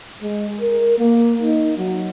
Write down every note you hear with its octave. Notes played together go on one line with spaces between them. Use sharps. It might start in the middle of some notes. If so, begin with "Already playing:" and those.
G#3
A#4
A#3
D#4
F#3